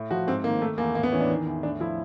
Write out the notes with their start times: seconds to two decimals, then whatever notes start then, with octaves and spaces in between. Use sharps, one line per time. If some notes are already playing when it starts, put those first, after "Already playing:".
Already playing: A2
0.11 F3 F#4
0.27 G#2 C4
0.44 D#3 A#3
0.61 D#3 A3
0.78 E2 A#3
0.95 A2 A#3
1.03 B3
1.13 E3 C#4
1.21 D4
1.29 D#3
1.46 E2
1.63 A2 D4
1.80 F3 E4